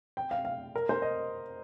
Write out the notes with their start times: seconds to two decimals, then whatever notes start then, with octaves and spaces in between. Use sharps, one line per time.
0.17 G5
0.31 F5
0.45 F5
0.76 A#4
0.89 C5
1.02 D#5